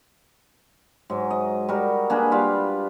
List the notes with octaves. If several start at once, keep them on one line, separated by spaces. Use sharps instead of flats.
G#2 F#3
D#5
G3 F#4 A#4
A#3 D4 G#4 B4
G3 F4 F5 B5